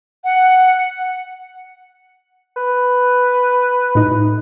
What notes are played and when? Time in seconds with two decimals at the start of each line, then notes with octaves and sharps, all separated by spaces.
0.24 F#5
2.56 B4
3.95 A2 D#4